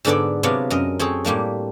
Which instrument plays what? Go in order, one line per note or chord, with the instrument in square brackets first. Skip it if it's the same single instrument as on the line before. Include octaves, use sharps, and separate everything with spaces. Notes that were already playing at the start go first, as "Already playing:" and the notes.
[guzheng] G#2 D3 B3 D4 A4 D5
C3 F#3 B3 D4 F4
F#2 A#4 D#5
C4 G#4 A4 C#5
A2 G3 A#3 D4